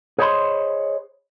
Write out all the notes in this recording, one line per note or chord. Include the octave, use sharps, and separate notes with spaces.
G#4 C5 C#5 D#5 B5 C6